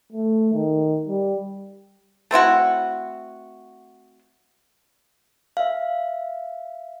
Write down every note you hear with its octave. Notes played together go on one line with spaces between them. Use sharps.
A3
D#3
G3
A3 C4 E4 F#4
E5 F5